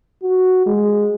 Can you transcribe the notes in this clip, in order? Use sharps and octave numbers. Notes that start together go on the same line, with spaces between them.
F#4
G#3